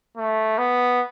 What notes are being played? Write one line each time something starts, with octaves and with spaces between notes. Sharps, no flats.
A3
B3